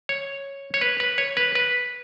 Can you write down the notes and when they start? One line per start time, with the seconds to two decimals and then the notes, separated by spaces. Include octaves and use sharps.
0.09 C#5
0.74 C#5
0.81 B4
1.00 B4
1.18 C#5
1.37 B4
1.55 B4